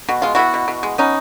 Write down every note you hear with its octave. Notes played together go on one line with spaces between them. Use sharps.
B2 F#4
G#3 F4
B3 E4 F#4
B2
B2
G#3
B3 C#4 D#4